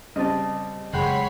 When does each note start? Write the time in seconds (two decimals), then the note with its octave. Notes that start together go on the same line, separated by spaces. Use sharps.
0.16 C#3 G3 C4 D#5 A5
0.93 F#1 G#3 C#5 F#5 G5 B5 C7